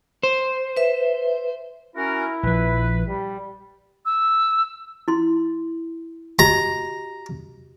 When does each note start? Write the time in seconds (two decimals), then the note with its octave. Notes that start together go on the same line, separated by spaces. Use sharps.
0.23 C5
0.77 B4 E5
1.96 C#4 E4 F#4 A#4
2.43 A#1 F3 B4
3.08 G3
4.05 E6
5.08 E4 C6
6.39 F#4 G4 D#5 A#5